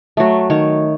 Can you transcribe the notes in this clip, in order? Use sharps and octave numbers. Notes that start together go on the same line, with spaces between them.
F#3 A3
D#3 C#5